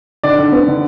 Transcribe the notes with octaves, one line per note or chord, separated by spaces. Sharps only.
D3 D5
D3
B3
D3